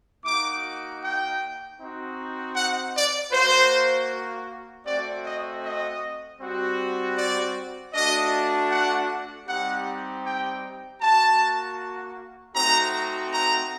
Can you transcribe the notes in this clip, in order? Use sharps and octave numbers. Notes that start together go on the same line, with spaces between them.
A#3 D#4 F#4 D6
G5
C4 D#4 F#4
F#5
D5
A#3 F#4 C5
A3 C4 F#4 D5
D#5
D#5
G3 C4 F#4
D5
A3 D4 F#4 D#5
F#5
G3 C4 D#4 G4 F#5
G5
A#3 F#4 A5
A3 C4 D#4 F#4 A#5
A#5